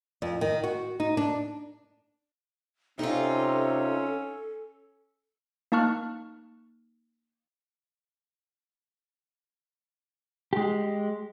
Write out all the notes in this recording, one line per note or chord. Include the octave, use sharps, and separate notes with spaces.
F2
D#3
F#4
D#4
D4
C3 C#4 D#4 F4 A4
A#3 D#4 A5 C#6 F6 F#6
G#3 G4